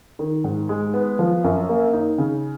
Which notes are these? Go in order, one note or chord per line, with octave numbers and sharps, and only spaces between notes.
D#3
G#2
G#3
B3
F3
F#2
A#3
D#4
C#3